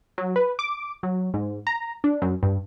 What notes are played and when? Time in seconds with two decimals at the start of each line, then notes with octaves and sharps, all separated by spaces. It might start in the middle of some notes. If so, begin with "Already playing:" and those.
0.18 F#3
0.36 B4
0.59 D6
1.03 F#3
1.34 G#2
1.67 A#5
2.04 D4
2.22 F#2
2.43 G2